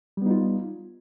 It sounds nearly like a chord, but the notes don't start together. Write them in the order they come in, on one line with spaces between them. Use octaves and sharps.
G3 B3 D#4 F4